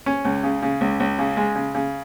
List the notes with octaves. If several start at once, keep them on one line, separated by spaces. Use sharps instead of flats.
C#4
C#2
C#3
C#3
C#2
C#2
C#3
G#3
C#3
C#3